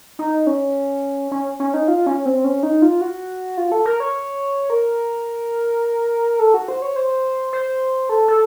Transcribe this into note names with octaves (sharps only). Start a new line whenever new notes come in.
D#4
C#4
C#4
C#4
D#4
F4
C#4
C4
C#4
D#4
F4
F#4
F4
A4
A#4
C#5
A#4
A4
F#4
C5
C#5
C5
C5
A4
A4